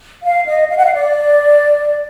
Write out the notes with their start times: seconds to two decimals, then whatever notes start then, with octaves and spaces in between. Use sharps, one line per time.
0.23 F5
0.47 D#5
0.70 F5
0.77 F#5
0.84 F5
0.94 D5